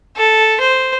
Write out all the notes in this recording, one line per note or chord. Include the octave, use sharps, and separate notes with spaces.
A4
C5